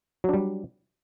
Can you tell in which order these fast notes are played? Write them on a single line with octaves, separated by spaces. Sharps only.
F#3 D4 G3